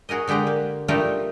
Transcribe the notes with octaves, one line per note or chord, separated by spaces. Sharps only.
F#4 G#4 A#4 D#5
D3 G#3 G4 D5 A#5
A#3
G3 A3 D4 D#4 F4 A#4